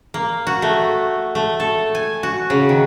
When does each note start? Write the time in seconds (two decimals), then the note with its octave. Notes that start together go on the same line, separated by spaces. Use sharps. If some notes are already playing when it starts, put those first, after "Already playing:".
0.14 A#3
0.47 F#4
0.62 A3
1.35 A3
1.60 A4
1.95 G#5
2.23 F#4
2.50 C#3
2.69 D#3